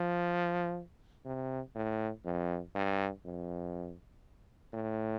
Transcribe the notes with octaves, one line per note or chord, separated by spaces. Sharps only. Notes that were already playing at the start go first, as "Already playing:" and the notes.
Already playing: F3
C3
A2
F2
G2
F2
A2